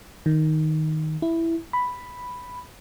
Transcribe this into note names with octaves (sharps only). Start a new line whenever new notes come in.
D#3
E4
B5